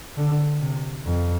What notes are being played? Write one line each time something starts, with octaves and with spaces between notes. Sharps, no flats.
D3
C3
F2